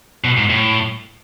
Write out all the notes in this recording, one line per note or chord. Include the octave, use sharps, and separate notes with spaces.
B2
G#2
A2